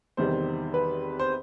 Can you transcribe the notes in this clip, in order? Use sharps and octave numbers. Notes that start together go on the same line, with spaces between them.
E2 C3 D#3 G3 C5
B4
C5